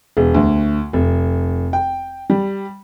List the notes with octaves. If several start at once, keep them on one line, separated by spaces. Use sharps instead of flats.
E1
D2
F1
G5
G3